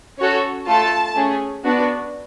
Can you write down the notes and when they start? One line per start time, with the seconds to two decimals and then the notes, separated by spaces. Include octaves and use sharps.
0.18 C#4 F#4 A4 C#5
0.67 A3 F4 A4 A5
1.15 A3 C#4 G#4
1.64 B3 D4 F#4